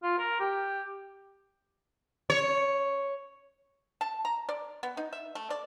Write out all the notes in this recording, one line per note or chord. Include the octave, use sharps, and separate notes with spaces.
F4
A#4
G4
C#5
A5
A#5
D5
B3
D#4
E5
A3
D5